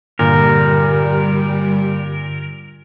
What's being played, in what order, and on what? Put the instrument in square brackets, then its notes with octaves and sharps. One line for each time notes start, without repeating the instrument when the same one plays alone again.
[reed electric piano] G2 D3 [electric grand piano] A#2 [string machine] G3 [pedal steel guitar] A#4